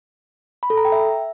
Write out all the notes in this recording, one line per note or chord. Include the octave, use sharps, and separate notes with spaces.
B5
A4
A#5
G5
E5